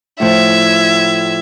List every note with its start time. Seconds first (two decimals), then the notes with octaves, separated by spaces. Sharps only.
0.20 A2 F3 E5 G#6